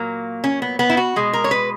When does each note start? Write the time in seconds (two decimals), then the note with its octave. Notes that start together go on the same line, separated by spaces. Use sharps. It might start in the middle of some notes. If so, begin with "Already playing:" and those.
Already playing: A#2 F#3 A#3
0.44 C#4
0.62 B3
0.79 B3
0.90 E4
0.97 F#4
1.16 B2 G#3
1.33 A#4
1.44 C#5
1.51 B4